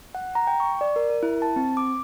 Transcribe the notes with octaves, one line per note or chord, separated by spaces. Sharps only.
F#5
A#5
G5
C#6
D5
A#4
A#4
E4
A5
C4
D6